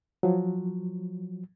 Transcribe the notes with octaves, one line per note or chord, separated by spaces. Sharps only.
F3 F#3